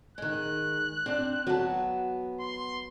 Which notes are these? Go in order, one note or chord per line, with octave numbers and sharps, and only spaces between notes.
D#3 G#3 F#6
C4 D4
F#3 B3 A5
C6